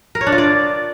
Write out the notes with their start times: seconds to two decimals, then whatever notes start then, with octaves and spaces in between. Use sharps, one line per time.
0.15 A#4
0.21 C#5
0.27 D4
0.32 F4
0.38 D5